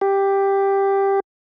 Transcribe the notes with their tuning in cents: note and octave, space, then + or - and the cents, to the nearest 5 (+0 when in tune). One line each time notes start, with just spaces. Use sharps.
G4 +5